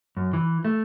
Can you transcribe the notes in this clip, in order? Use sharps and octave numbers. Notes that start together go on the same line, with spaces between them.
F#2
E3
A3